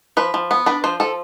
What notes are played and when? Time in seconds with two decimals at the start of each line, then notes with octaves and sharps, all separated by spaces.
0.17 F3 B4
0.34 F3
0.51 B3
0.66 D4 B4
0.84 F3 C5
1.00 F3 A4